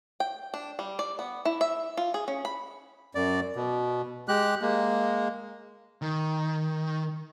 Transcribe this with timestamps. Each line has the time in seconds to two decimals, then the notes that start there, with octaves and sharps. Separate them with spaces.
0.20 G5
0.54 D4
0.79 G3
0.99 D5
1.19 B3
1.45 E4
1.61 E5
1.97 F4
2.14 G#4
2.28 C#4
2.45 B5
3.15 F#2 D5
3.56 B2
4.28 G#3 G4 F#6
4.62 G#3 A#3
6.02 D#3